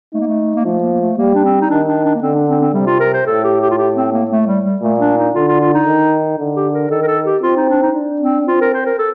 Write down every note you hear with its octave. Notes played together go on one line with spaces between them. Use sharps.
A3 D#4
A#3
A3
A#3
F3 A3
A#3
A#3
A3
G3 A#3
D4
C4
D#4
D#3 D4
D4
D4
A#3
D3 C4
D4
C4
C4
C3 G3
F4
A#4
C5
A2 A4
G4
G4
F4
G4
C4
A#3
A3
G3
G3
A#2 A3
D4
D#4
D3 F4
F4
F4
D#4
D#3
D3
G4
A#4
D#3 A4
A#4
A4
G4
C4 F4
D#4
D4
D#4
D4
C4
C4 F4
A#4
C5
A#4
A4